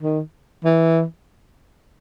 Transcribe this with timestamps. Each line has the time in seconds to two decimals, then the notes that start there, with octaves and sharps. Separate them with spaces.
0.01 D#3
0.65 E3